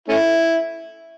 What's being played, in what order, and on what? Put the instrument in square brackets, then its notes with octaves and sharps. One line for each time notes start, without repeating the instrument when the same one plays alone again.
[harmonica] A3 C#4 E4